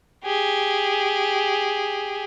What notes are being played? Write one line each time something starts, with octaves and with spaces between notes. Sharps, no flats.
G4 G#4